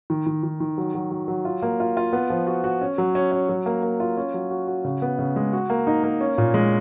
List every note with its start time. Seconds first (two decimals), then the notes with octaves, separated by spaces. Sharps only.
0.10 D#3
0.26 D#3
0.43 D#3
0.60 D#3
0.78 F#3
0.95 F#3
1.11 F#3
1.28 F#3
1.45 F4
1.62 A#3
1.80 F4
1.97 F4
2.13 B3
2.30 F3
2.47 F#4
2.64 F#4
2.81 C#4
2.98 F#3
3.15 C#4
3.32 C#4
3.49 F#3
3.66 A#3
3.83 A#3
4.00 F4
4.17 C#4
4.34 F#3
4.51 F#4
4.68 F#4
4.85 C#3
5.02 B3
5.19 C#3
5.36 G#3
5.53 F#4
5.70 A#3
5.87 D#4
6.04 A#3
6.21 C#4
6.38 A#2
6.54 G#3